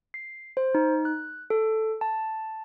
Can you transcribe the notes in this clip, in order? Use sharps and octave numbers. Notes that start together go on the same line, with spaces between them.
C7
C5
D#4
F#6
A4
A5